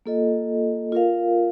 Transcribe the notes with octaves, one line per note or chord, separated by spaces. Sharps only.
A#3 F4 A4 D#5
F4 A#4 F5